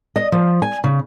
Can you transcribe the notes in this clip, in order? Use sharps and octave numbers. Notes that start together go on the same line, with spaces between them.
D#5
F3
G#5
C#3